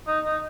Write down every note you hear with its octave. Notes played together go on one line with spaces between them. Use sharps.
D#4
D#4